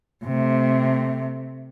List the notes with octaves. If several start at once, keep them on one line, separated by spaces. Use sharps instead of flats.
C3 A3